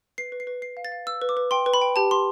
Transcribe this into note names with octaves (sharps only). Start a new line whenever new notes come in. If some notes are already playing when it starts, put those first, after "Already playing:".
B4 C7
B4
C7
B4
B4 C7
F5
A6
F5
B4 E6
B4
D6
B4
G5 C6
B4
B5
G5
G4 A5
G4 C6